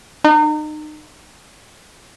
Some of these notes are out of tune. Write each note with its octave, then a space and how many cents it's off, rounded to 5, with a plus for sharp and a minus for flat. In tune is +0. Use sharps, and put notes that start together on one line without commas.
D#4 -35